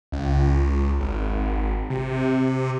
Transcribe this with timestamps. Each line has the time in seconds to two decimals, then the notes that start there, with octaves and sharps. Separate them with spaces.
0.12 C#2
1.01 G#1
1.90 C3